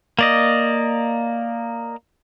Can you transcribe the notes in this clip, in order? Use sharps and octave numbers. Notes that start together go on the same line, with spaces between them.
A#3 D5 D#5